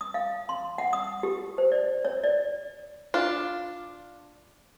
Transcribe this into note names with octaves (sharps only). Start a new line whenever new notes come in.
D#6
F5
C6
F#5
D#6
G4
C5
D5
C#5
D5
D4 F4